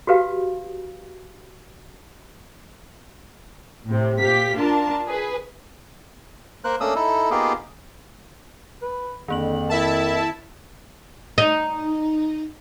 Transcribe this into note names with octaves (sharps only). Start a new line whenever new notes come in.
F#4 G4 B4 F5
A2 C3
A#2 G4 F5 B6
D4 F4 A#4 A5
G#4 B4
A#3 A#4 C5 F#6
A3 A#3 C#4 D4 D#6 E6
D#4 E4 A4
A#3 B3 D#4 F4 G4 G#4
B4
F2 D3 D#3 A#3 F#7
E4 A#4 E5 A5
D#4